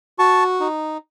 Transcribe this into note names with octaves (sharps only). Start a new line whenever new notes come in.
F#4 A5 C#6
D#4